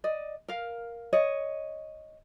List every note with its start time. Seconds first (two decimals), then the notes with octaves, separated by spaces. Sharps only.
0.04 D5 D#5
0.48 A#4 F5
1.13 C#5 D#5